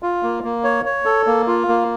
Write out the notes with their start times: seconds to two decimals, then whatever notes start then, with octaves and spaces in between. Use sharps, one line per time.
0.03 F4
0.23 A#3
0.44 A#3
0.64 C#5
0.86 C#5
1.05 A4
1.27 A#3
1.47 F4
1.69 A#3